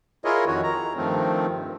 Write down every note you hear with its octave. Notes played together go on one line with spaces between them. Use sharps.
E4 F4 G#4 A#4 C#5 D#5
F2 D#3 F#4 C#5
A#5
G2 D#3 F3 A3 C4